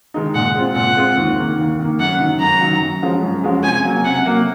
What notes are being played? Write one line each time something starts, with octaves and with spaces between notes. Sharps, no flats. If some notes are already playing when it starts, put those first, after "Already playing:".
D#3 G#3 D#4
A#2 F#5
G#3 C4 F4
A#2 F#5
G#3 C4 F4
D#2
D#3 A#3
D#2
D#3 A#3
F#2 F#5
D#3 F#3
F#2 A#5
D#3 F#3
F#2
F3 G#3 C#4 F#4
F#2
F3 G#3 C#4 F#4
C3 G#5
F#3 A#3
C3 F#5
F#3 A#3